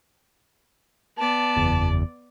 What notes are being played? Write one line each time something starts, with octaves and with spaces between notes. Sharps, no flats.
B3 D5 A5
F#1 E2